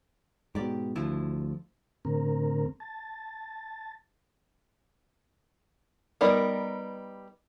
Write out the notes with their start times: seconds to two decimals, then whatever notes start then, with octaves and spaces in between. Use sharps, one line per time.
0.55 G#2 B2 G4 D5
0.96 D2 F3 E4 F4
2.05 A2 D3 C4 A#4
2.80 A5
6.21 G3 B3 D#4 A#4 D5